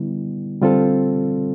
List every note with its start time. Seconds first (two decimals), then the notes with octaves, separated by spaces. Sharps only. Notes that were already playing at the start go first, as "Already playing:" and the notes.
Already playing: D3 G3 B3 E4
0.62 D3 G3 C4 F4 A4